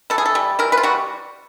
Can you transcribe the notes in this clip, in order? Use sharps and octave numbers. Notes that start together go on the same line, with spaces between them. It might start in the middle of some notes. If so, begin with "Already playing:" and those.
E3 A4
G#4
A4
G3
E3 A#4
B4
F4
G3 F#4